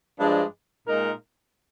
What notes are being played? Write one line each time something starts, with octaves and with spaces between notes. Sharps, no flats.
G2 F3 G#3 D4
A#2 G#3 D#4 A#4